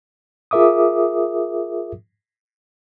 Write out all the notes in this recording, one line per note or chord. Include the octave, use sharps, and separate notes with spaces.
F4 G#4 A#4 E5 D6 D#6